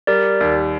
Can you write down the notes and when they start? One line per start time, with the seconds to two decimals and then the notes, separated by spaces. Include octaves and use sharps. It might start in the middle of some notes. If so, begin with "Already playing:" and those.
0.07 G3 A#4 D5
0.41 D#2